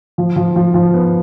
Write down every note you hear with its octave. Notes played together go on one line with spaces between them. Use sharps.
F3
F3
F3
F3
B3